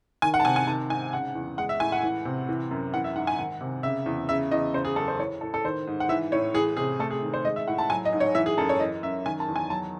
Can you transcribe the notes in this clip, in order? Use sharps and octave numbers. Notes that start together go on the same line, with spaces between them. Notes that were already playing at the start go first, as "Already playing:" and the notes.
D#3 G#5
F#5
A5
C3 G#5
G#5
D#3 A5
G#2 G#5
C#3 F#5
E2
G#3 F#5
E5
A2 G#5
F#5
E3
C3
E3
F#2
E3 F#5
E5
G#2 F#5
G#5
D#3 F#5
C3
C#3 E5
E2
C#3 E5
E2 D#5
C#3 C5
G#4
F#2 A4
C5
E3 C#5
A2 A4
A4
D#3 C5
G#2
F#5
E3 E5
A2 C#5
E3 G#4
C3 G#4
A3 A4
G#4
D#3
C5
G#3 D#5
E5
A2 F#5
A5
F#3 G#5
D#5
G#2
C#5
E3 E5
G#4
F#2 A4
C#5
E3 D#5
F#2 E5
D#3 G#5
A5
E2
G#5
F#3 A5